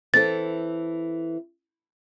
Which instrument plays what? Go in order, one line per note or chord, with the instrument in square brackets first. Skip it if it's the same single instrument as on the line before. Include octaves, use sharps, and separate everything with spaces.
[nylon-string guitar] E3 C4 A4 [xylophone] A6